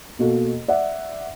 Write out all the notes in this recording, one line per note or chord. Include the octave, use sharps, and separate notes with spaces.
B2 A#3 F#4 A4
D5 E5 F#5